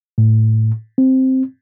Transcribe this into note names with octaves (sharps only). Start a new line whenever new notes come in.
A2
C4